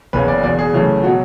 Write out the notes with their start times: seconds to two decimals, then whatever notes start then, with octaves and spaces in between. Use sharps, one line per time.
0.13 F#1 E2 C#3 B4
0.28 D5
0.43 E1 E2 B2 D5
0.59 G#4
0.73 F#2 C#3 E3 A3
1.03 F#4
1.06 B2 F#3